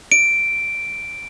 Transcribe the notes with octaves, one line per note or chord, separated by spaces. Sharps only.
D7